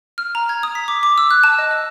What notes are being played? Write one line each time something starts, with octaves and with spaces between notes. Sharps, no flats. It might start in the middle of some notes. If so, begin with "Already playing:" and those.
F6
A#5
G#6
D#6
B6
D6
D6
E6
F#6
A5
D#5
D#5